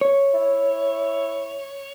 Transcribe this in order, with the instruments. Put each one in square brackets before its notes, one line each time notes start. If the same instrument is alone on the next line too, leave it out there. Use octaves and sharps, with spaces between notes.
[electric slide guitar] C#5
[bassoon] E4